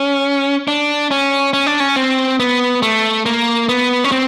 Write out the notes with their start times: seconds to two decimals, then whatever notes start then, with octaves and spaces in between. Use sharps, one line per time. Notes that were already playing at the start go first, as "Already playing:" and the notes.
Already playing: C#4
0.68 D4
1.11 C#4
1.53 C#4
1.66 D4
1.80 C#4
1.96 C4
2.40 B3
2.82 A3
3.26 A#3
3.69 B3
4.04 C#4
4.12 C4